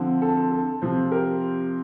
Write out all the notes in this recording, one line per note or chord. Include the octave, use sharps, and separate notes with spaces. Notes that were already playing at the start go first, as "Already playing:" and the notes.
Already playing: D3 F3 C4
A4
A4
A4
C3 F3 C4
G4 A#4